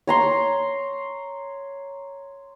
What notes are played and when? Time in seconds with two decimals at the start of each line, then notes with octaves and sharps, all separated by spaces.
0.07 C#5 A#5 C6